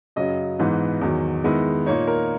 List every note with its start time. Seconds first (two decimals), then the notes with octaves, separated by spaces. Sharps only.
0.16 F#2 C#3 F#3 D#5
0.59 G#2 E3 B3 D#4
1.01 E2 D#3 F#3
1.44 D#3 G#3 B3 E4 D#5
1.86 A#2 A#3 D#4 C#5
2.07 A#4